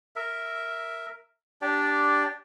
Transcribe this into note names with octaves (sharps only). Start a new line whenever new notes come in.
A#4 E5
D4 G4 D5